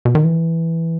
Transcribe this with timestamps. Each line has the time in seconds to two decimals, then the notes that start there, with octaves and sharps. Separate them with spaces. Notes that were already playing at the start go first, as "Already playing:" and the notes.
0.05 B2
0.15 D#3
0.24 E3